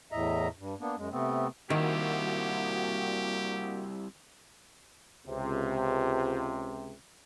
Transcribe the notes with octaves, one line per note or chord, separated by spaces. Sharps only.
E2 A2 D#5 E5 A#5
G2
A#3 B3 D4
F#2 G#3
C3 A3 B3 C4
D#3 G3 A#3 C4 E4 F#4 G4
C#2 C3